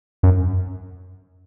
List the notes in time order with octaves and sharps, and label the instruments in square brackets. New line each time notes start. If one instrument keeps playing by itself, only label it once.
[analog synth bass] F#2